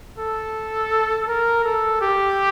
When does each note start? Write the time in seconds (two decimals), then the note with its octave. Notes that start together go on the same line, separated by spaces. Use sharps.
0.19 A4
1.28 A#4
1.64 A4
2.01 G4